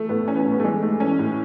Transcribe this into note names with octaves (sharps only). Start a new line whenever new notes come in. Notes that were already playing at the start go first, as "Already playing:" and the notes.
Already playing: E3 A3
A2 B3
E3 C#4
B3
C#4
A2
B3
A3
E3 G#3
G#2 A3
E3 C#4
A2